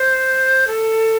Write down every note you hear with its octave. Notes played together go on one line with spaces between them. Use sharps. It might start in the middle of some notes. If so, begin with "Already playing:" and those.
Already playing: C5
A4